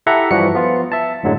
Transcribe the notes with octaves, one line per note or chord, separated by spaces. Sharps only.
E4 G4 A4 E5 F#5 A#5
G2 E3 F3 D4 F#4 C#7
F3 B3 F4
E5 A5
F#2 A2 D3 F#3 G#3